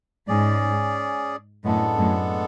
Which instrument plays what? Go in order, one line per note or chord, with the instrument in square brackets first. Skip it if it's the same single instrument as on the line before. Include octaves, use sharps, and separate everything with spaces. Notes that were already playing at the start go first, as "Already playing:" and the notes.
[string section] G#2 [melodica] C#4 G#4 D5
[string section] F#2 A2 [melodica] G#3 B3 D4 A4
[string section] F#2 A2